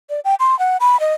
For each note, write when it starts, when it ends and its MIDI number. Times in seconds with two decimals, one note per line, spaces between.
0.10 0.20 74
0.24 0.35 79
0.40 0.57 84
0.59 0.77 78
0.80 0.99 83
1.00 1.14 75